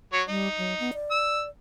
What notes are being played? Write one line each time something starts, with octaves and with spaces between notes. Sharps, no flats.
F#3 C#5
G3 D#4
F#3
B3
D5
E6